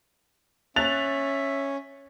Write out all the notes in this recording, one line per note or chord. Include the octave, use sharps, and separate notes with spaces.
C#4 E5 F#6 A6 F7